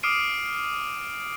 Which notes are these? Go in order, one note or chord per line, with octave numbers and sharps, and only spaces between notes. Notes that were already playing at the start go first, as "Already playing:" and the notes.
D6 D#6 F6 C7 D7 D#7